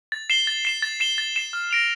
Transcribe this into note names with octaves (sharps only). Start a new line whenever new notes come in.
A6
C7 E7 G7
A6
C7 E7 G7
A6
C7 E7 G7
A6
C7 E7 G7
F6
A#6 D7 F7